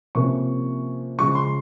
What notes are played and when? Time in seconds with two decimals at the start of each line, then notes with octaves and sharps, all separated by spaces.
0.15 C3 F3 A#3 C#4 C#6
1.18 C#3 F3 G#3 C#4 C#6
1.35 C6